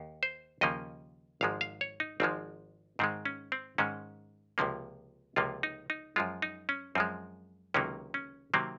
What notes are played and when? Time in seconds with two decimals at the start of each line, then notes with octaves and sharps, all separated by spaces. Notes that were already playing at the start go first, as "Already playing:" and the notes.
Already playing: D#2
0.23 C5
0.61 D#2 C#3 F3 A#3 D#5
1.41 G#1 G#2 F3 G#3 F5
1.61 F5
1.81 C#5
2.00 D#4
2.20 G#1 G#2 F3 G#3 C4
2.99 G#2 D#3 G#3 C4
3.25 C#4
3.52 C4
3.78 G#2 D#3 G#3 C#4
4.58 C#2 C3 F3 A#3
5.36 C#2 C3 F3 A#3 F4
5.63 D#4
5.90 D#4
6.16 F#2 F3 G#3 F4
6.42 D#4
6.69 C#4
6.95 F#2 F3 G#3 C4
7.74 C#2 C3 D#3 F#3 A#3 C#4
8.14 C#4
8.54 C3 D#3 F#3 A#3 C4